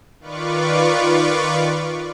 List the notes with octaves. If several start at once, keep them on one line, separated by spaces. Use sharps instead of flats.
D#3 F4 B4 D5 C#6 D6